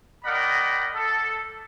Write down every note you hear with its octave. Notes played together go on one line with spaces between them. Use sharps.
A#4 D5 D#5 F#5 G5 B5
A4